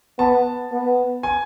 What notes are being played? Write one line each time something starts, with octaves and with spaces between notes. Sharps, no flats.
B3 A5
B3
G#5